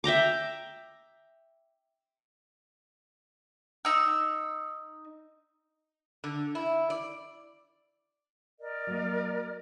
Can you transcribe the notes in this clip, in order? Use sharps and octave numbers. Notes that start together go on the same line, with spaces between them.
E5 G5 A#5 D6
D#4 E6
D3
E4
D5
A#4 D5 D#5
F#3 A#3